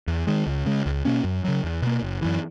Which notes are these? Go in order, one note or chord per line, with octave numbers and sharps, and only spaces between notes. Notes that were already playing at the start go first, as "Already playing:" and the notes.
E2
D#3 G#3
C#2
C#3 G#3
C#2
B2 A#3 C#4
F#2
C#3 F#3
E2
B2 A#3
F#1
F#2 E3